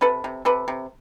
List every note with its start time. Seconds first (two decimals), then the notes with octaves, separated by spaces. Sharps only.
0.01 C3 A4 B4
0.24 C3
0.45 C3 A4 B4
0.68 C3